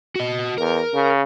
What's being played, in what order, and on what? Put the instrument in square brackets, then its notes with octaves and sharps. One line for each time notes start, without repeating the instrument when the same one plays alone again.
[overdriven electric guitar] F#4 D#5
[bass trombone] E2 [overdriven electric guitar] A#4
[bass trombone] C#3